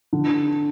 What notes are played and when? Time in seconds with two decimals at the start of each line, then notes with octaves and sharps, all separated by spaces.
0.13 D3